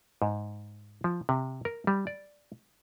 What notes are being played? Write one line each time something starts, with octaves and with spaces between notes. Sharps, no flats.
G#2
F3
C3
A#4
G3
D5